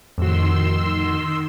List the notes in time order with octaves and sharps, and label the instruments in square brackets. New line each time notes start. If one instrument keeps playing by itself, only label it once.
[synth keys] F2 A2 F#4 [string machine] D#3 C6 E6